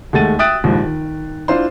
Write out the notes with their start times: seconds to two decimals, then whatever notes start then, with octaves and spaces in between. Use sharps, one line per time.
0.13 D#2 G#3 A3 F#5 A6 D#7
0.39 E5 G5 D#6 F#6 A6 D7
0.64 A#1 D#2 G#2
0.83 D#3
1.48 D4 E4 F4 C5 C6